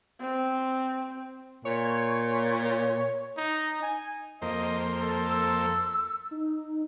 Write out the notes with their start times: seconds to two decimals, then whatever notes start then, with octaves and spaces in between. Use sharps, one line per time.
0.21 C4
1.65 A#2 C#5
3.37 D#4
3.83 G#5
4.42 F2 A#3 C5 D#5
4.99 A4
5.31 E6
6.31 D#4